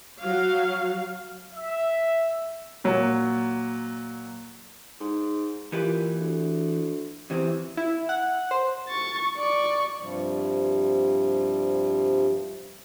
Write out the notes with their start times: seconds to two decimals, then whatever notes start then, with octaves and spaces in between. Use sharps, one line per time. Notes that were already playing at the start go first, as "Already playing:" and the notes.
0.22 F#3 F5
1.53 E5
2.84 A#2 F#3
5.00 G#2
5.72 A#2 E3 G4 B4
6.20 D2
7.30 E2 C3 E3 C4
7.77 E4
8.09 F#5
8.51 C5
8.89 C#6 A6
9.37 D5 C#6
10.00 G2 C3 F3 G3